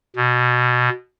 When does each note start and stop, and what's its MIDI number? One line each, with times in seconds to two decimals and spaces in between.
0.16 0.89 47